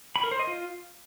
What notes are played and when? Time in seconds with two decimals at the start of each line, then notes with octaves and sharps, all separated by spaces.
0.16 B5
0.23 A#4
0.31 C5
0.39 D#5
0.47 F4